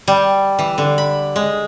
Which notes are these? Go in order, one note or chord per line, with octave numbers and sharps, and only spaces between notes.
G3
E3
D3
B5
G#3